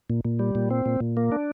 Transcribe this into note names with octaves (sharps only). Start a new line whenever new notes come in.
A#2
A#2
G3
A#2
C4
A#2
A#2
A#3
D4